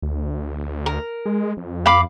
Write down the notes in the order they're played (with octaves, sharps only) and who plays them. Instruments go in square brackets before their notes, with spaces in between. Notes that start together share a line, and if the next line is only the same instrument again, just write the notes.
[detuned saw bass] D2
[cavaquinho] A#4
[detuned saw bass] G#3
F2
[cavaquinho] F5 B5 D6